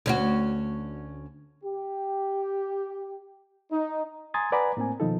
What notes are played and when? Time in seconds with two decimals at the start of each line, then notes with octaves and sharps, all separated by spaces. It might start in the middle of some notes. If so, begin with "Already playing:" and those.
0.06 D2 C#4 F#4
1.63 G4
3.71 D#4
4.34 G#5 A#5 C6 D#6 G#6 A6
4.52 B4 D5 F#5 G#5 A#5 B5
4.77 A2 A#3 C4 G#5
5.00 B2 D#3 F3 D#4 F4 A4